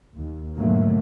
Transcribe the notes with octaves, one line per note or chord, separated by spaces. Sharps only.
D#2
G#2 B2 D3 F#3 A3 A#3